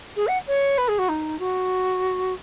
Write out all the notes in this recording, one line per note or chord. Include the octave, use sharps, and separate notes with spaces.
G#4
F#5
C#5
B4
G#4
F#4
D#4
F#4